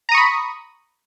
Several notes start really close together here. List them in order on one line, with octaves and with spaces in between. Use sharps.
A#5 D#6 C#6 B5